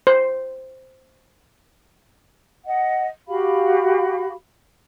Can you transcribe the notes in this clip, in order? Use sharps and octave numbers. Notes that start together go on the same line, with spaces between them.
C5
D#5 F#5
F#4 G4 F5 B5